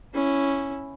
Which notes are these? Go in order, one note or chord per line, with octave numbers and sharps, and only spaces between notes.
C#4 E4